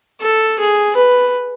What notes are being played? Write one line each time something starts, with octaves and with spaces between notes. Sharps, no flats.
A4
G#4
B4